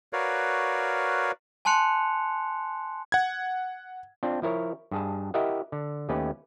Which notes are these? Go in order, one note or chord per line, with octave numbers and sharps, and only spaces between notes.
F#4 A#4 B4 C#5 D5 F5
G#5 A5 C6 F#6 C#7 F7
F#5 G#6
C4 D4 F4
F3 E4 A#4 C#5
G2 G#4 A5
E4 G4 A#4 D#5 E5 F#5
D3
D#2 A3 C#4 G4 B4